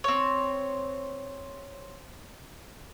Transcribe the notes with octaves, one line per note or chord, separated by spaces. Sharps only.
C4 C#5